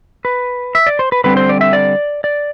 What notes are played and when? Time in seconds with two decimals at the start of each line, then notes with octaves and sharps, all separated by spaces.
0.25 B4
0.75 E5
0.87 D5
0.99 C5
1.12 B4
1.24 D3 G3 C4 B4
1.37 C5
1.49 D5
1.61 E5
1.73 D5
2.24 D5